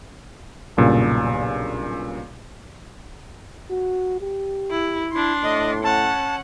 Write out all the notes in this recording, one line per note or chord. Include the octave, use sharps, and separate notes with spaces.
B1 G2 A#2 C#3
F#4
G4
E4
D4 E4 C6
A2 D#5
C#4 F#5 A5